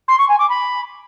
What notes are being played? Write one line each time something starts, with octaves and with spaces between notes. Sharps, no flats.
C6
C#6
G#5
D6
B5